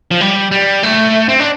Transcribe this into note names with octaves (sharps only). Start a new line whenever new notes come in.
F3
G3
G3
A3
C4
D4